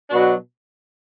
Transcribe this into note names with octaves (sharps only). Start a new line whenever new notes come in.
B2 F#3 D4 F#4